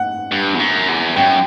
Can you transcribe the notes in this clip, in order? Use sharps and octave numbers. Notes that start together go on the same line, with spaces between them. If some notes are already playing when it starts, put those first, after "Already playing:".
Already playing: F#5
G2
E2
F#2
E2
F#2 G5